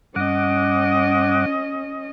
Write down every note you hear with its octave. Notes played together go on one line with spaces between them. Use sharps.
G2 C#4 D#5 F#5 D6